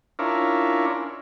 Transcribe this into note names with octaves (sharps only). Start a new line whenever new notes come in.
C#4 D4 E4 F4 A#4